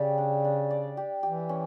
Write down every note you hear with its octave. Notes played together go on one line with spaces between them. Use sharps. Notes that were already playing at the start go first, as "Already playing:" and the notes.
Already playing: C#3 G4 D5
D4
D4
D5
G4
E3 G4
C#4